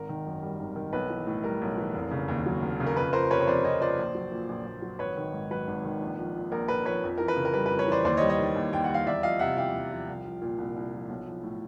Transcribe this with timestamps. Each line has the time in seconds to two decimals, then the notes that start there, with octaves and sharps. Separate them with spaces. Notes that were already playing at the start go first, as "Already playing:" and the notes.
Already playing: G#1 A#4
0.09 D#3
0.26 F#2
0.43 G3
0.60 G#1
0.76 D#3
0.93 B1 B4
1.10 E3
1.27 A2
1.43 G3 A#4
1.62 B1
1.78 E3
1.94 F1
2.11 C#3
2.28 D#2
2.46 F#3
2.62 F1
2.80 C#3
2.86 A#4
2.96 F2 B4
3.13 F3 A#4 C5
3.31 C3 B4 C#5
3.41 C#5
3.47 F2 C5 D5
3.64 F2 C#5 D#5
3.81 F3 C5 D5
3.99 A#1
4.15 F#3
4.31 A#2
4.49 A#1
4.66 A#1
4.82 F#3
4.99 G#1 B4 C#5
5.17 D#3
5.33 G#2
5.51 F#3 B4
5.67 G#1
5.85 D#3
6.01 A#1
6.18 F3
6.36 A#2
6.52 A#1 A#4
6.68 A#1 B4
6.85 F3 B4 C#5
7.04 F2
7.18 E3 A#4
7.28 B4
7.36 C#3
7.45 A#4
7.54 G3 B4
7.66 B4
7.71 F2
7.79 B4 C#5
7.88 E3 C5 D5
8.05 D#2 C5 D5
8.17 C#5 D#5
8.21 G3
8.29 C#5 D#5
8.39 D#3
8.55 D#2
8.73 D#2 G5
8.84 F#5
8.89 G3
8.94 F5
9.06 E2 D5 E5
9.23 F3 D#5 F5
9.39 C3 E5 F#5
9.56 E2 F5 G5
9.74 E2
9.91 F3
10.08 C2
10.25 F3
10.41 A#2
10.58 C2
10.76 C2
10.93 F3
11.09 B1
11.26 F3
11.43 A2